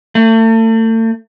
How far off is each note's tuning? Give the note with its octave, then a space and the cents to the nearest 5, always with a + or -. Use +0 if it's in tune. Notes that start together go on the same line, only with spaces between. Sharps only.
A3 +35